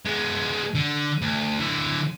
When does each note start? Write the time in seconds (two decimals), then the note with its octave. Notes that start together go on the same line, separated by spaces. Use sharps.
0.06 G#3 B3
0.75 D3
1.22 D2
1.59 D3 E4